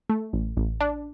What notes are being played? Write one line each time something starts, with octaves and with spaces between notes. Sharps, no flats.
A3
A1
A1
D4